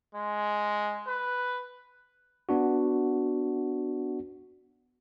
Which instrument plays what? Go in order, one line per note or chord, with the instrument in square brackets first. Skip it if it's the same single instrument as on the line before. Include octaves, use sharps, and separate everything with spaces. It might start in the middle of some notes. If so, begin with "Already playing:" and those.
[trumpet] G#3
B4
[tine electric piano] B3 D4 F#4